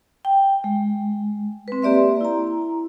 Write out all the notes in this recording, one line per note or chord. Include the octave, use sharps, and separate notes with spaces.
G5
G#3
C4 B4
A#3 G4 D5 E5 C6
E4 A#5